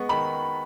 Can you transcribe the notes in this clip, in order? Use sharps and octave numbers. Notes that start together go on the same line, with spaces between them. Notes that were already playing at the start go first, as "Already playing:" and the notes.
Already playing: G#3 B3 C#6
D#3 B5